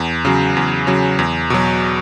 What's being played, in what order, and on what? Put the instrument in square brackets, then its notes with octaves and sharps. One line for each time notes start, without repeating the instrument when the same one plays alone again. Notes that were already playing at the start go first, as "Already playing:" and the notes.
Already playing: [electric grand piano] E2
C#3 F#3
E2
C#3 F#3
E2
B2 F#3